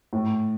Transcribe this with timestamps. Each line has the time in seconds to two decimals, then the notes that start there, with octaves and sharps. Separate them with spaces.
0.13 A2